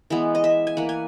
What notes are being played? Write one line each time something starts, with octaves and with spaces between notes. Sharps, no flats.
E3 G#3 B3
D#5
E5
G#5
E3 A#3 F#5
G#5